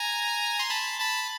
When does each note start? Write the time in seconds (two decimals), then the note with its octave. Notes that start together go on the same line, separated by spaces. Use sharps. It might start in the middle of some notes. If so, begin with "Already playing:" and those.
Already playing: G#5 A#5
0.59 C6
0.70 A5 B5
1.00 A5 B5